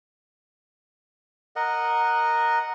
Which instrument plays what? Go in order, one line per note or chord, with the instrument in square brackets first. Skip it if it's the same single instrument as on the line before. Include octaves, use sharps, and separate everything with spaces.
[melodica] A#4 D#5 F#5